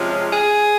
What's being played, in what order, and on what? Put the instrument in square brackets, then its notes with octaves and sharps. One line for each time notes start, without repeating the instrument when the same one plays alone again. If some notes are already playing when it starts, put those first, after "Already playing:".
Already playing: [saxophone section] C3 F3 G#3 C#4 F4
G#4